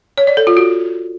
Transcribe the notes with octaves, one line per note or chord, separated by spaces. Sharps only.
C#5
D5
A4
F4
F#4